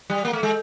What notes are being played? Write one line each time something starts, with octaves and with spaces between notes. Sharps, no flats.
G3
A#3
A3
G#3